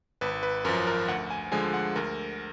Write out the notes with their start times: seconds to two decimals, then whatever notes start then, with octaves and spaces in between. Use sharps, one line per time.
0.21 G#1 B4
0.43 B4
0.65 F#2 F3 A#4
0.87 A#4
1.08 D2 F#5
1.30 G#5
1.52 D3 F3 G#3 G#5
1.74 F#5
1.96 D2 A#4